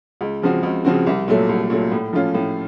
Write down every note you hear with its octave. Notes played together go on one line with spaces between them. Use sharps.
C#2
C#3 F3 C4 F#4
C#2
C#3 F3 C4 F#4
C2
A#2 F#3 A3
C2
A#2 F#3 A3
A2
F3 A3 C#4 F4
A2